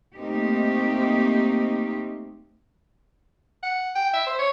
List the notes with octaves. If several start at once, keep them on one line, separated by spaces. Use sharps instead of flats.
A3 A#3 C4 D#4 G4
F#5
G5
E5
C5
C#5